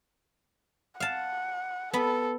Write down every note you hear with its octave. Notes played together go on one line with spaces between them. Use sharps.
F5 F#5 A5
B3 A4 B5